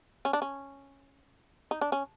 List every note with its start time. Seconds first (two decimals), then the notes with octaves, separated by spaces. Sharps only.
0.25 C#4
0.33 D4
0.42 C#4
1.71 D#4
1.81 D4
1.92 C#4